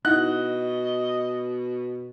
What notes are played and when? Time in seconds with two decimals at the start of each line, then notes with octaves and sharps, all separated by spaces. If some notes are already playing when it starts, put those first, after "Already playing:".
0.05 B2 D#4 E4 D#5 F#5 F#6